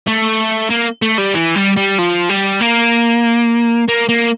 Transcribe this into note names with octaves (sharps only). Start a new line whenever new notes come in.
A3
A#3
A3
G3
E3
G3
G3
F3
G3
A#3
A#3
A#3